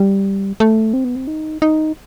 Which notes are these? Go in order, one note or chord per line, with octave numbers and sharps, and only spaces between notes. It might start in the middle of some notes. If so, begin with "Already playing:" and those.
Already playing: G3
A3
C4
B3
C4
D#4
D#4